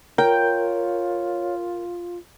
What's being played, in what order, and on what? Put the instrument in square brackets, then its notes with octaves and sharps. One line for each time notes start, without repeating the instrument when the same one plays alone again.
[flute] F4 [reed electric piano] A#4 [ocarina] C#5 [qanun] G5